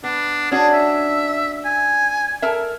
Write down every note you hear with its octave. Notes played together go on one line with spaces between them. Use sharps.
B3 D4
C#4 D4 F#4 G#4
E5
G#5
A4 A#4 E5